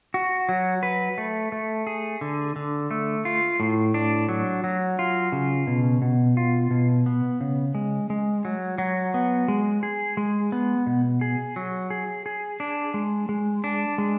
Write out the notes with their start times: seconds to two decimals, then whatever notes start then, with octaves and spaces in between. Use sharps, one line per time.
0.14 F#4
0.49 F#3
0.83 B4
1.18 A3
1.52 A3
1.87 G#4
2.21 D3
2.56 D3
2.91 A3
3.25 F4
3.60 A2
3.94 D4
4.29 F#3
4.64 F#3
4.99 F4
5.32 C#3
5.67 B2
6.02 B2
6.37 F4
6.71 B2
7.06 B3
7.41 C#3
7.75 G#3
8.10 G#3
8.45 F#3
8.78 F#3
9.14 B3
9.48 G#3
9.83 G#4
10.17 G#3
10.52 B3
10.86 B2
11.21 G#4
11.56 F#3
11.90 G#4
12.26 G#4
12.60 D4
12.94 G#3
13.29 G#3
13.64 D4
13.98 G#3